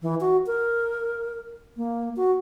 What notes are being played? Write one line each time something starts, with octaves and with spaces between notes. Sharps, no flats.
E3
F#4
A#4
A#3
F#4